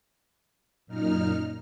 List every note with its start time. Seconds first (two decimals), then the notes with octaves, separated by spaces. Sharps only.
0.87 F#2 A#2 D#4 F6